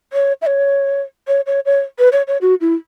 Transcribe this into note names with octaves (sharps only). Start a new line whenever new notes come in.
C#5
E5
C#5
C#5
C#5
C#5
B4
C#5
C#5
F#4
E4